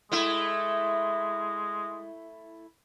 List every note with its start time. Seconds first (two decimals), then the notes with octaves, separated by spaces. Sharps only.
0.12 G#3 A3 E4